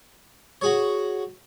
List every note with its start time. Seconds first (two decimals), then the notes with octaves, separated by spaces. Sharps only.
0.61 F#4 G#4 C#5